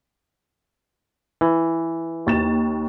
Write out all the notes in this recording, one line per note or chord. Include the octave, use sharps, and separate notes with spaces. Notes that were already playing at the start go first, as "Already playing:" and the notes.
E3
D#2 A6 E7